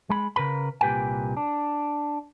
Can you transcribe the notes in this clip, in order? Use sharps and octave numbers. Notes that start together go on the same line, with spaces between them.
G#3 B5
C#3 A#4 B4 B5
C2 A#2 G4 B4 G5 G#5
D4